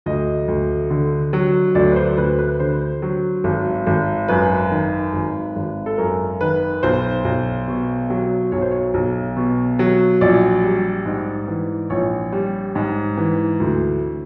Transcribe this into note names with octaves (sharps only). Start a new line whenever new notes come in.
D2 D#5
D2
D3
F#3
D2 D5
B4
C5
D2 B4
B4
D3 C5
F#3
G#1
G#1
F#2 B4
D#3
G#1
G#1
A4
F#2 A#4
D#3 B4
B1 C5
B1
B2
F#3
B1 C#5
C5
C#5
B1
B2
F#3
A#1 D5
G3
G#2
E3
A#1 C#5
G3
G#2
E3
D2